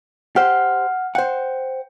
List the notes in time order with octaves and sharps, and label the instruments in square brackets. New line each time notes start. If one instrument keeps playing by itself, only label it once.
[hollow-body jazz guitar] G4 C5 [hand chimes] F#5 F6
[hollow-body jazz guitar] C5 F#5 [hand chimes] G5